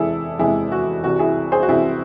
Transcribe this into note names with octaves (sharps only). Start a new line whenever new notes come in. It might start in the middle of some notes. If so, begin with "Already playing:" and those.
Already playing: E2 C3 E3 G#3 E4 G#4 A4
E2 C3 E3 G#3 E4 G#4
F#4
C2 C3 E3 F#4
E4 G#4
G#4 C5
F#4
C2 C3 E3 E4 G#4